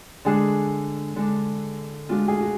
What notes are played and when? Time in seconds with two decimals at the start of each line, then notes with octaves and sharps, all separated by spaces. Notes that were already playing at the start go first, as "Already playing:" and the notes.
0.25 D3 G#3 D4 G#4
1.16 D3 G#3 D4
2.09 G#3 D4 F4 F#4
2.28 G#4
2.40 F#4